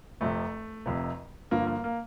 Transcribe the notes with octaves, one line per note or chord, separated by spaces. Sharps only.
F1 F2 C3 A3
F1 F2 C3
G1 G2 D3 F3 A#3
A#3
A#3